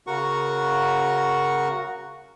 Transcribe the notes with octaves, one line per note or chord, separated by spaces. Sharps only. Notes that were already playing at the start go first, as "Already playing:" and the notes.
C#3 F#4 A#4 F#5 C#6